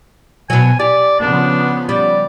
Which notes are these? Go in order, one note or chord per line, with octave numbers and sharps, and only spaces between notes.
B2 F#3 G#5
G4 D5
C#3 F3 B3 D4
G3 D5